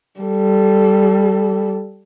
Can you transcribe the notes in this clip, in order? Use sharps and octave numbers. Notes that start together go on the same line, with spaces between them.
G3 A4